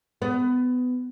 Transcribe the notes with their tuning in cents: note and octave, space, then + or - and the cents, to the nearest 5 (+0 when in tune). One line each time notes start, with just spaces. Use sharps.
B3 +20